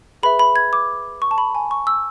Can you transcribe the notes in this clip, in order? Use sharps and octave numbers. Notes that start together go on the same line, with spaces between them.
G#4 B4 E5 B5
B5
G#6
D6
C#6
A5
B5
G#5
C#6
E6